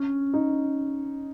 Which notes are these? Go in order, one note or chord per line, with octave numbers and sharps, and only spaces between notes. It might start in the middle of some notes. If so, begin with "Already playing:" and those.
Already playing: C#4
D#4